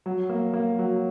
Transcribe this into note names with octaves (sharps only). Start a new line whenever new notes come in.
F#3
A#3
A#3
F#3